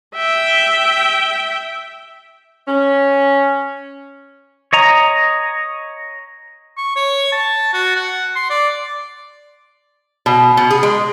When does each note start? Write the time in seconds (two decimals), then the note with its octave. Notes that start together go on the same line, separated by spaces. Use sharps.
0.15 E5 G5
2.68 C#4
4.73 C#5 D#5 A#5
6.77 C#6
6.96 C#5
7.32 A5
7.74 F#4
7.96 F#5
8.36 C6
8.50 D5
10.26 B2
10.57 B2
10.70 G#4
10.83 G#3